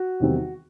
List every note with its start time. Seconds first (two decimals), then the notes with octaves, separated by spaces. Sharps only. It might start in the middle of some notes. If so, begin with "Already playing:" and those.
Already playing: F#4
0.20 E2 C3 D#3 G3 C4